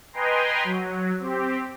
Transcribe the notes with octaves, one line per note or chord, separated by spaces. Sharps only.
B4 D#5 G5 G#5 A#5 C6
F#3
C4 G4